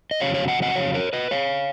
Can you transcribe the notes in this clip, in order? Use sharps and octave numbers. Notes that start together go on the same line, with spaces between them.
D#5
F2 C#3 F#3 C#5 F5
C#5 F5
D#5 F#5
D#5 F#5
C#5 F5
A#4 C#5
B4 D#5
C#5 F5